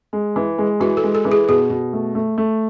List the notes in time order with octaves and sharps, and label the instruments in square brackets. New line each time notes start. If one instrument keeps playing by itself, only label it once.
[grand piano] G#3
E3
G#3
[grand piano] E3 [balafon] F#4
[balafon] A4
[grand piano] G#3
[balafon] A4
[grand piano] E3
[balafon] G#4
[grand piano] B2 [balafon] G#4
[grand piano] B2
A3
A3
A3